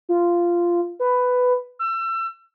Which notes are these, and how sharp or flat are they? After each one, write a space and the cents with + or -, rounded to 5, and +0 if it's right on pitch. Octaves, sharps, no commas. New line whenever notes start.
F4 -10
B4 +10
E6 +30